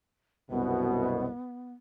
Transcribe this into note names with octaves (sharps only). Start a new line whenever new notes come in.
C2 F#2 B2 B3